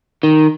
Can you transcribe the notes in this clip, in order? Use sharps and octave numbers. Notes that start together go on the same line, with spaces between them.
D#3